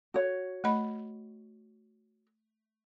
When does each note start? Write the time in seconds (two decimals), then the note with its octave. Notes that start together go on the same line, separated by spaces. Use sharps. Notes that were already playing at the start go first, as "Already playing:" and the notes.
0.14 F#4 C#5
0.64 A3 D#5 B5